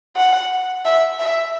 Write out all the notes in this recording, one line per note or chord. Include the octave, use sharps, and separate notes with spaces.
F#5
E5
E5